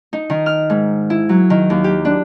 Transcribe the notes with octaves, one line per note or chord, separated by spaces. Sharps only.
D#4
D#3
F6
G#2
E4
F#3
D#3
D#2
G4
D4